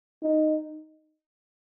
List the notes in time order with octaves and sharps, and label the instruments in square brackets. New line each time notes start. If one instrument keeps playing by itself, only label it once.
[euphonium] D#4